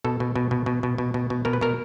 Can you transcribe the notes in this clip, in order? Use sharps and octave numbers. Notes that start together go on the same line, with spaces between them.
B2 A4
B2
B2
B2
B2
B2
B2
B2
B2
B2 A#4
B4
B2 A#4